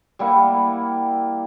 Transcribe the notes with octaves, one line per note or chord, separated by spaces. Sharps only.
G3 A#3 E4 F#5